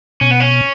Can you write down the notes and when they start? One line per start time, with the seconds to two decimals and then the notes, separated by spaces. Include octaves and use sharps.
0.21 B2 C#4
0.31 B3
0.40 C#4